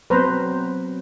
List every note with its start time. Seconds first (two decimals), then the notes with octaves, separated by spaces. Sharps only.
0.10 F#3 B3 C4 B4 C5 A#5